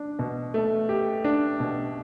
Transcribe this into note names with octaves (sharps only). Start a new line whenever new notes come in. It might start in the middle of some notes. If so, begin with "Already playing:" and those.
Already playing: D4
B2
A3
G4
D4
B2